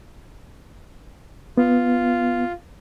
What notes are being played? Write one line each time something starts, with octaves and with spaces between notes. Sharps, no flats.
B3 F4